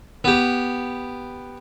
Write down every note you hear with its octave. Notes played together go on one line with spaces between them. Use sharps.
B3 G4